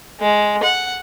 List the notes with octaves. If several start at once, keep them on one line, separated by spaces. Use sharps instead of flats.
G#3
F#5